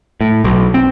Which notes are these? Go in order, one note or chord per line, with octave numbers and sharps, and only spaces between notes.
A2
B1
C4